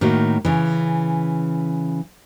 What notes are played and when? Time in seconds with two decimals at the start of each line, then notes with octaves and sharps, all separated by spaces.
0.01 A2 D#3 A#3 F#4
0.45 C#3 E3